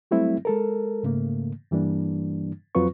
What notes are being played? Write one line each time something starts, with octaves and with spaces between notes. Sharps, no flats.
F#3 G3 A3 C4 E4
G#3 A4 A#4
G#2 C#3 A3 A#3
G2 E3 G3 A#3 D4
F2 F#3 C4 F4 B4 C#6